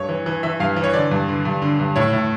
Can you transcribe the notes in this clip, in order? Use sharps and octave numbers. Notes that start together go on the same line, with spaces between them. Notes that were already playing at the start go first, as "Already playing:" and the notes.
Already playing: G2 C#5
E3
E3
E3 E5
G2 F5
E3
C#5
D3 D5
G2
D3
G2
D3
G2
A2 C#5
A2